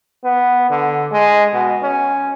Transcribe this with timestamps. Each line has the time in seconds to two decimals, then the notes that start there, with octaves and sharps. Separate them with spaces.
0.24 B3
0.70 D3
1.12 G#3
1.54 B2
1.83 C#4